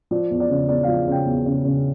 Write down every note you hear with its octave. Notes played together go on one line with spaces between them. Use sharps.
F3 D5
E2
D5
C#3
E2 D5
F3 F5
C#3 G5
E2
C#3
C#3